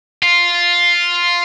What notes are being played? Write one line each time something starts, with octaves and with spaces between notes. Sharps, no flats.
F4